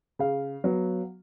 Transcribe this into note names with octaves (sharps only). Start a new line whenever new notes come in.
C#3 F5
F#3 B3